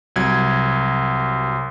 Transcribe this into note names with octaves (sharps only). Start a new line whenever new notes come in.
C2 F#3 G#6